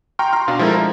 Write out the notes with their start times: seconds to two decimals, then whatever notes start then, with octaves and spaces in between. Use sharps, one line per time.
0.19 G5 A#5 C6 C#6 F6
0.33 A#5 C6 F6
0.48 B2 D4 F5
0.59 F3 G#3 E4 A4 A#4
0.75 A#5